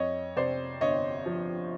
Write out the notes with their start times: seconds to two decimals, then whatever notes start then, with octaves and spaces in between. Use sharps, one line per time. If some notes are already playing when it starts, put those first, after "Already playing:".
Already playing: F2 C#5 D#5
0.36 C3 C5 D5
0.81 G1 C#5 D#5
1.26 F3